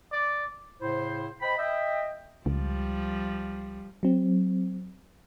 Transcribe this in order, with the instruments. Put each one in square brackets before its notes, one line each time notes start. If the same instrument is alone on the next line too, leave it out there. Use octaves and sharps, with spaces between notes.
[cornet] D5
[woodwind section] A2 C#3 E4 C5
C5 D#5 G5 B5
D#5 E5 G5
[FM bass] C#2 [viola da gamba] F3 G3
[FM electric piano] F#3 C4